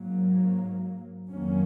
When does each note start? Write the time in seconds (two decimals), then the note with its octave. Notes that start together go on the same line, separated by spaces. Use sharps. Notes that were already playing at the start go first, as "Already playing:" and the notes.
Already playing: G#2 F#3 A#3
1.30 F2 D#3 F#3 A#3 C#4